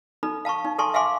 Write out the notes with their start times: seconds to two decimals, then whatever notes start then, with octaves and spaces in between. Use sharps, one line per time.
0.23 D#4 A4 B5
0.45 F5 A5 B5 C#6
0.65 D#4
0.79 A4 G#5 A5 C6 C#6
0.94 E5 F5 G#5 C6 D6